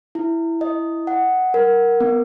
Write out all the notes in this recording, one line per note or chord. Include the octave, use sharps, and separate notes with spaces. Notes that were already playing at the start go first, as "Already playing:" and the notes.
E4
D#5
F#5
A#4
B3